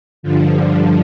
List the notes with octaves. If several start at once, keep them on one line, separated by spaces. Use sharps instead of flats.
G2 D3 F3